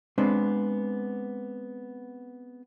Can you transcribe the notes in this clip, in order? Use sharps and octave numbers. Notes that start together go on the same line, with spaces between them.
G#3 B3 C4 D4